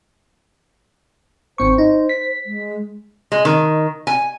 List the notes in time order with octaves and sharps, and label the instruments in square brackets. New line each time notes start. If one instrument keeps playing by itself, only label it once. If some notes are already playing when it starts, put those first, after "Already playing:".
[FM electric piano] G#1 C4 C#6 [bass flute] C5
[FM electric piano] D#4
B6
[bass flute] G#3
[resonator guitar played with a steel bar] G#3
D#3
G#5